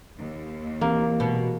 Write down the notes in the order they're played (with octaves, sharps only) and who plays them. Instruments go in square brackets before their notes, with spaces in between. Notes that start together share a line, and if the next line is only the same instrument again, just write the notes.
[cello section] D#2
[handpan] E3 C4 G4 [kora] A#3
[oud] B2 [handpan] G#3 F#4